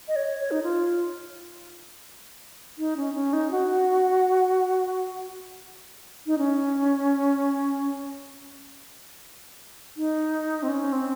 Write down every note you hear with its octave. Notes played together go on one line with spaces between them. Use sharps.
D#5
C#5
C#5
D#4
F4
D#4
C#4
C#4
D#4
F#4
D#4
C#4
D#4
C4
C#4
C4